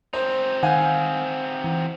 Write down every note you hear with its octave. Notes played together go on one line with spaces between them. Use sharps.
C4 D#4 C5
D#3 F5 F#5 G#5 G6
E3